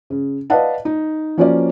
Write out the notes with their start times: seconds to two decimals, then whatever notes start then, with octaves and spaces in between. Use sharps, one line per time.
0.10 C#3
0.50 B4 D5 D#5 F5 F#5 A5
0.85 D#4
1.38 F3 A#3 C#4 F#4 C#5 D5